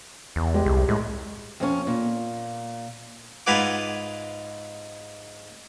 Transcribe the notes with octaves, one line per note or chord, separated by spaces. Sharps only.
E2
G#3 G4
C2
A2 G#3
F2 C#4
A#2
G#2 F4 B4 F#5 G#5 D6